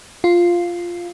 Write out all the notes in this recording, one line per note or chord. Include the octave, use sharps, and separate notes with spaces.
F4